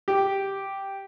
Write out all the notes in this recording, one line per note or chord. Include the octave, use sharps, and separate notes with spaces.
G4